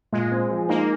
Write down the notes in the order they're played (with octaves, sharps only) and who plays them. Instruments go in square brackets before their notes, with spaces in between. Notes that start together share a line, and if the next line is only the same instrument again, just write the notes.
[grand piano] A#2 [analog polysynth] G#3
[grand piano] C4
F3
[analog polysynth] A#3 [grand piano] D#4